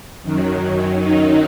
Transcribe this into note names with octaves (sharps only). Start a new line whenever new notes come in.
F#2 D#3 F#3
D#4